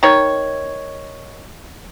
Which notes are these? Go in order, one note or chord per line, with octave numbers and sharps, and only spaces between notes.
D#3 C#5